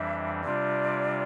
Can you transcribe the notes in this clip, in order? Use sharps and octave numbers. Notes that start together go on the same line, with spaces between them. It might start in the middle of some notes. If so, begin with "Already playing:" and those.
Already playing: F2 E3 G3 D4 E5
C3 G3 D4 F4 D5